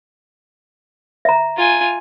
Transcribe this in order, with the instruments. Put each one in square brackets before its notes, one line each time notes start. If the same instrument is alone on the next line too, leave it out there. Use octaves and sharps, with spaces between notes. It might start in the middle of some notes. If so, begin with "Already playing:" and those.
[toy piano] E5 A#5
[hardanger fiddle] F4 G#5